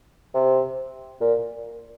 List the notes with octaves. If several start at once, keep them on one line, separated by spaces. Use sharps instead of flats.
C3
A#2